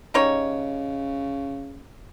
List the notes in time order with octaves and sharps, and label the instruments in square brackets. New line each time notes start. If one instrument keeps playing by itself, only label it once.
[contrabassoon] C#3 [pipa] G3 D#4 C#5